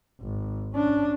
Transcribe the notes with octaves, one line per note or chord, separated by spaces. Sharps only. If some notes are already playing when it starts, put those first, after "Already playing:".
G#1
C#4 D4